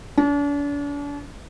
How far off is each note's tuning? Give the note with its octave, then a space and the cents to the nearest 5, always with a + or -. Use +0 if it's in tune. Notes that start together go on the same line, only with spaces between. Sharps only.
D4 -40